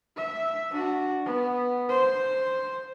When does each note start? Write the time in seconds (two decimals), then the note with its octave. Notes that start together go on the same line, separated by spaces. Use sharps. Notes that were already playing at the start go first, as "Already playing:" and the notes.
0.16 E5
0.71 D4 F#4
1.25 B3
1.89 C5